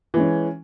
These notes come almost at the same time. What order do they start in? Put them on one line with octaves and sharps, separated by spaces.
E3 G#3 C#4